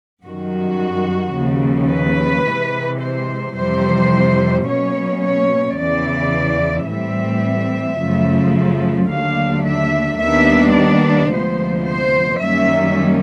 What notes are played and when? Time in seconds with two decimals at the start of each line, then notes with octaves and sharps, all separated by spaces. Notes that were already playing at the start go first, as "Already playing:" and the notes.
0.24 F#2 D#3 G3 F#4
1.35 D#2 C#3 F3
1.91 B4
2.46 C3 E3 G#3
3.01 C5
3.56 F2 C3 E3 G3 C5
4.67 B2 F#3 A#3 C#4 C#5
5.22 C#5
5.78 E2 C#3 E3 D5
6.88 A2 E3 G3 C4 E5
7.98 F#2 C#3 F3 A3
9.10 D#2 D3 F#3 A3 D4 F5
9.65 E5
10.20 D#2 D#3 G3 B3 D4 E5
10.75 D5
11.30 D2 C3 F3 G#3 B3 C5
11.86 C5
12.41 F#2 D#3 G3 A#3 C#4 E5